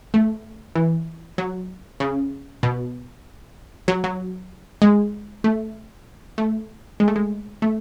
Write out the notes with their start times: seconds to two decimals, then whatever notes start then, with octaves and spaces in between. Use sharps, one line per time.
0.14 A3
0.75 E3
1.38 F#3
2.00 C#3
2.63 B2
3.88 F#3
4.04 F#3
4.82 G#3
5.44 A3
6.38 A3
7.00 G#3
7.08 A3
7.16 G#3
7.62 A3